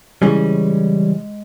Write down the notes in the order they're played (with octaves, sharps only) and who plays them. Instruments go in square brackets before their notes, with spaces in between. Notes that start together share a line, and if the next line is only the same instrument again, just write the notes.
[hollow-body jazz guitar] C#3 E3 G3 C#4 G#4 [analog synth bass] G#3